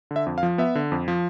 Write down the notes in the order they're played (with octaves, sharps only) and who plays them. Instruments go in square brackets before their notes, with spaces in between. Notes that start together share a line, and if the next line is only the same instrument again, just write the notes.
[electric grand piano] D3
E5
F2
F5
F3
B3 E5
D3
F2
F3